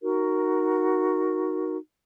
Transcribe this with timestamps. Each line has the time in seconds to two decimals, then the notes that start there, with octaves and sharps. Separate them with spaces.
0.02 D#4 F#4 A#4